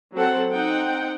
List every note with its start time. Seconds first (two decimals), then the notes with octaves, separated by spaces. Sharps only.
0.14 F#3 C4 A4 F#5
0.50 C4 D#4 F#5 G5